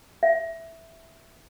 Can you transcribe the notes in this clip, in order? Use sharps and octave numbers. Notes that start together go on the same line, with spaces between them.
E5